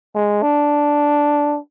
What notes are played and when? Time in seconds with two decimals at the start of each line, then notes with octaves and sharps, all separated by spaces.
0.15 G#3
0.42 D4